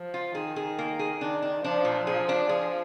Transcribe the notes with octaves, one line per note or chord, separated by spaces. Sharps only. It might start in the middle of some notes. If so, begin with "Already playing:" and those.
Already playing: F3
F4
D#3 G#4
G#4
A#3
G#4
D#3 D4
D4
F3 D4
A#2
F3 G#4
D4
F3 G#4